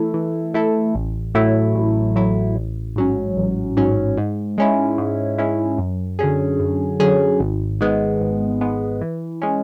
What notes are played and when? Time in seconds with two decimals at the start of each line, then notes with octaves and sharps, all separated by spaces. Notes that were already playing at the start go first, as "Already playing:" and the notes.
Already playing: E3 A3 E4 A4
0.14 E3
0.54 A3 E4 A4
0.95 A1
1.35 A2 F#3 A3 E4
1.75 A1
2.15 A2 F#3 A3 E4
2.56 A1
2.96 G#2 F#3 C#4
3.37 A1
3.77 G#2 F#3 C#4
4.17 G#2
4.58 G#3 C#4 E4
4.98 G#2
5.38 G#3 C#4 E4
5.78 F#2
6.19 D3 F#3 C#4 G#4
6.60 F#2
7.00 D3 F#3 C#4 G#4
7.40 G#1
7.81 G#2 G#3 B3
8.21 G#1
8.61 G#2 G#3 B3
9.01 E3
9.42 G#3 C#4